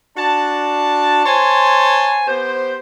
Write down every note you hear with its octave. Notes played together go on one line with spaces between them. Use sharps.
D4 F#4 A5
C5 C#5 G#5 A5 C6
B3 G4 C5